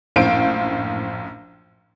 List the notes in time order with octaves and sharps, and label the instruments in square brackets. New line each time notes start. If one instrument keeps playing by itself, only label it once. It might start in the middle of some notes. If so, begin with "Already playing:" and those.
[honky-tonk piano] A#1 F#2 A2 C5 F5 D7